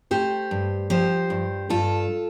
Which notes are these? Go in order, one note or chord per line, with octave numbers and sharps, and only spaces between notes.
A3 G4 C5
G2
F3 G4 C5
G2
G2 F4 A4